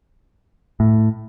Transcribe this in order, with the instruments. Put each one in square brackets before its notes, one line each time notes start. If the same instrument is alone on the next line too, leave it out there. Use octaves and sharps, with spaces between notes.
[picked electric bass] A2